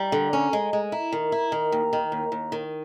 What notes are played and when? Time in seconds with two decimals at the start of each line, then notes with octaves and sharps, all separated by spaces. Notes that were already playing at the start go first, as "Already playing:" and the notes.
Already playing: G3 A#5
0.12 D3
0.33 C#4
0.53 G#3
0.73 G#3
0.92 E4 A#5
1.12 D#3
1.32 E4
1.52 D#3
1.72 D#2
1.93 D#3
2.12 D#2
2.32 D#2
2.52 D#3